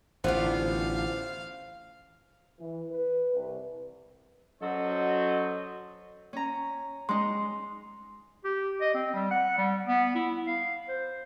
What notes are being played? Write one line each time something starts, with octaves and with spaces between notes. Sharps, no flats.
A1 A2 D3 B3 D4 F4 C5 F5
E3
B4
C2
F#3 C#4 F#4 A4 C5 D#5
C#4 A#5
G#3 D#4 C6
G4
D#5
C4
G3
F#5
G3
B3
E4
F5
C5